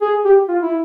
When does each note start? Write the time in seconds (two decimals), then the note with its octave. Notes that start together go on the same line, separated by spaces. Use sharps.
0.01 G#4
0.25 G4
0.48 F4
0.62 E4